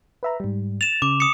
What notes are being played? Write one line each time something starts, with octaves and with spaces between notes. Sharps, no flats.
B4 E5 A#5
G#2 G3
A6 E7 F7
C#3 D6
D#6 C#7